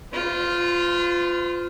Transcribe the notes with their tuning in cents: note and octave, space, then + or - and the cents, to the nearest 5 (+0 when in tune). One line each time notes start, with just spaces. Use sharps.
F4 +0 C5 -40